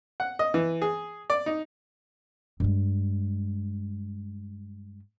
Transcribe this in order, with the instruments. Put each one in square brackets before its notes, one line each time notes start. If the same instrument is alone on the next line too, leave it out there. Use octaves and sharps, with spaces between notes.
[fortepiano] F#5
D#5
E3
G#4
D5
D#4
[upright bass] G2 G#3